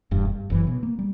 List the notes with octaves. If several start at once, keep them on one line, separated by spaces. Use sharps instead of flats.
E1 G2
G2
F#1 F#2 E3
B2
A#3
G3